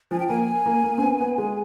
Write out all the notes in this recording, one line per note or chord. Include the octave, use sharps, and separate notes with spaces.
F3 G#5
G5
A#3 G#5
A#3
A#3
C4
B3
B3
G#3